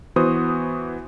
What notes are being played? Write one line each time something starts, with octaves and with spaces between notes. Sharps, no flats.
E3 B3 F#4 C5 D#6